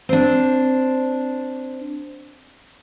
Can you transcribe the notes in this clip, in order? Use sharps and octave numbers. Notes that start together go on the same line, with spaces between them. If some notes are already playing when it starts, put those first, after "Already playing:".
C4 D4